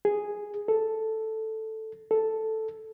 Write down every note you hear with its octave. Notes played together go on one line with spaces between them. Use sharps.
G#4
A4
A4